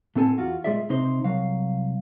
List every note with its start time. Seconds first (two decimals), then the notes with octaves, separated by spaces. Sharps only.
0.16 A2 B3 C4 A4 G#5 A5
0.38 E2 F4 F#4
0.64 A#2 G#3 F4 G#4 D5 E5
0.89 C#2 C3 D#4 C5 C6
1.24 C2 F#3 F5